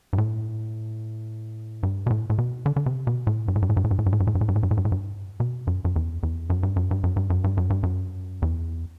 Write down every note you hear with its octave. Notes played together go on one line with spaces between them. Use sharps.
G2
A2
G2
B2
A2
A2
B2
D3
D3
C3
B2
A2
G2
A2
G2
A2
G2
A2
G2
A2
G2
A2
G2
A2
G2
A2
G2
A2
G2
A2
G2
A2
G2
B2
F#2
F#2
E2
E2
F#2
G2
F#2
G2
F#2
G2
F#2
G2
F#2
G2
F#2
E2